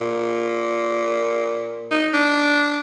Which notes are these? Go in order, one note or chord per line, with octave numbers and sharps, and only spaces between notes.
A#2
D#4
D4